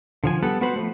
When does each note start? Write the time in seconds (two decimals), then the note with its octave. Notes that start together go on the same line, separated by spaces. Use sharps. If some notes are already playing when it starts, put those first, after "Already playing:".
0.24 D3 F3 G#5
0.43 G3 B3 A4 F#5
0.61 B3 F#4 B4 C5 B5
0.76 F3 A3